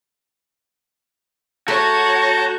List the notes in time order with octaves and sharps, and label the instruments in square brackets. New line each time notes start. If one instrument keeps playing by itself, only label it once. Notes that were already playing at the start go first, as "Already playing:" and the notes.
[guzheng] A3 [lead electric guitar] F#4 [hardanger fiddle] C#5 [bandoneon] A5 A#5 G6